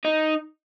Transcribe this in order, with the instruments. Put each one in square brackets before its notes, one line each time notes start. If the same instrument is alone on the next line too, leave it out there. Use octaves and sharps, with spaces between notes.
[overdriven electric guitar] D#4